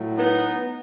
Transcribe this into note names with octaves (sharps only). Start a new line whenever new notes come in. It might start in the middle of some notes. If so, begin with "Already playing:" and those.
Already playing: A2 F#3
B3 D#4